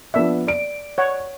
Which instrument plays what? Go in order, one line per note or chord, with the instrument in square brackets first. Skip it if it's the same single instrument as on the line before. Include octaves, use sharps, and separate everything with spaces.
[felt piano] F3 B3 D4 [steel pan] E5
[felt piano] D5 D7
[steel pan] C#5 F#5